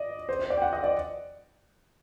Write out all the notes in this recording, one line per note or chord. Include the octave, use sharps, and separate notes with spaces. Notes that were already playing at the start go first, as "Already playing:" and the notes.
Already playing: D5 D#5
C5
C5
D5
G5
F#5
D#5
D5